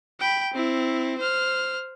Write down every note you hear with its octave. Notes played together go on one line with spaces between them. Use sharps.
G5 B5
C4 E4
C5 F6